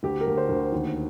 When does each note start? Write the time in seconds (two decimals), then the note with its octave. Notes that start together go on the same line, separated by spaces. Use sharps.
0.03 D2 G4
0.21 A#4
0.27 D2
0.38 C5
0.49 D2
0.73 D#2